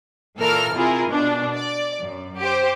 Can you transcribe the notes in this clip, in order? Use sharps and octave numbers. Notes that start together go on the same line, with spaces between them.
A#2 E3 A4 A#4 F6
C3 E4 F4 G#4 A#4
B2 D4
D5
F#2
G4 C5